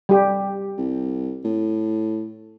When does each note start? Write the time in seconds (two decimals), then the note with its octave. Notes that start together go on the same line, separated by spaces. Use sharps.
0.09 G3 G4
0.78 C2
1.45 A2